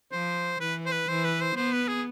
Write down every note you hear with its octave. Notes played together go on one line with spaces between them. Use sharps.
F3 C5
E3 B4
C5
B4
E3 C5
B4
C5
B3 C5
B4
G#4